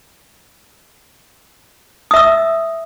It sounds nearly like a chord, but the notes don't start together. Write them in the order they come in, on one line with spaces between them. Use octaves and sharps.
D#6 E5 E6